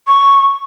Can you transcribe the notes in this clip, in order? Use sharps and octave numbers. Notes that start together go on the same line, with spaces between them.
C#6